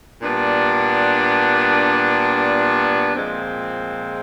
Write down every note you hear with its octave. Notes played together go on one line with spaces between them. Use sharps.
A#2 G3 B3 D4
A#2 F3 G#3 C4